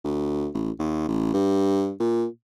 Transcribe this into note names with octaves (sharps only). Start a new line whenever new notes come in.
D2
A1
D#2
A1
G2
A#2